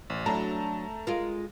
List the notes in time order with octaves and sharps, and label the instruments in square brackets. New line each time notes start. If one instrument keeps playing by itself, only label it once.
[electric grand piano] A1
[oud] F#3 D4 E4 [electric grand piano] A3 A5 A#5
[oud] G#3 F4 A#4